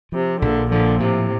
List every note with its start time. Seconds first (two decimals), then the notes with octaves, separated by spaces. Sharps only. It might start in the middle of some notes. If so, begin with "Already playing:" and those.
0.12 C3 F3
0.41 A#1 A#2 D3
0.71 A#2 D3 F3
1.00 A2 C3